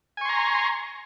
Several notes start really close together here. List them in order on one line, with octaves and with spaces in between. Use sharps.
G#5 C#6 C6 A#5